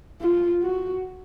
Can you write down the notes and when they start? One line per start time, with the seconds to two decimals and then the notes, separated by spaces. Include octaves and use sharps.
0.21 F4
0.62 F#4